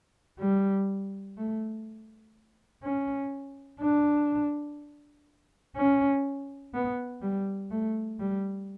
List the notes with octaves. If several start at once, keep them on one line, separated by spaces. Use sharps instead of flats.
G3
A3
C#4
D4
C#4
B3
G3
A3
G3